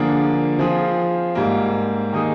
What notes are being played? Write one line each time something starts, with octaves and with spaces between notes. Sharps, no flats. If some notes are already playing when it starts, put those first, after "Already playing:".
Already playing: D3 F3 A#3 D4 G#4
F3 C4 F4 G#4
G#2 G3 A#3
D#3 A#3 D#4 G#4